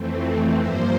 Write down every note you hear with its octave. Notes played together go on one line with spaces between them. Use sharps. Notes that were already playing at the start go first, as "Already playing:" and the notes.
Already playing: F2 E3 A3 C4
G2 F3 A#3 C5 E5